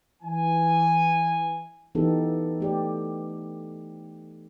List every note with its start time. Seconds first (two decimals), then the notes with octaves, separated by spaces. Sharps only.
0.23 E3 G#5
1.95 E3 B3 D#4 G4 A4
2.60 A3 G4 D5